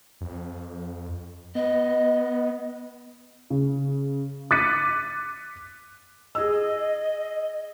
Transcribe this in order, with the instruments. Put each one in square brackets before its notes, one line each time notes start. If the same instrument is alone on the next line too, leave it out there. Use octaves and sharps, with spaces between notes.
[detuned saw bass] F2
[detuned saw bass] B3 [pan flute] D#5
[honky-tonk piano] C#3
D6 F#6 A6 B6 C#7 D#7
[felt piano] G#4 E6 [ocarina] D#5